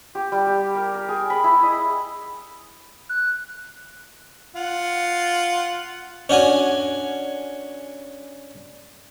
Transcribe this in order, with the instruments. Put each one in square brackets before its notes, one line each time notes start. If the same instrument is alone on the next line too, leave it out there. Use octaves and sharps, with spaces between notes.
[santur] G4
G3
G4
A#4
A#4
G#4
B5
E4
D#5
[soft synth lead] F#6
[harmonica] F4 F#5
[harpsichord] C#4 D4 F#4 G#5